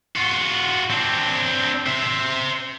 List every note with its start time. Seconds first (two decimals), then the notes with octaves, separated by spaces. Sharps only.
0.16 F4 F#4
0.90 C4 D4
1.87 C5 E5